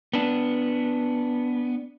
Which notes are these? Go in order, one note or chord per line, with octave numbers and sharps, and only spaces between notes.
B3 D4